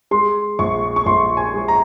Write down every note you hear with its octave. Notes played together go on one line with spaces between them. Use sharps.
G#3 C6
A#1 C#6
C#6
A#1 C6
G#5
G#3
A#5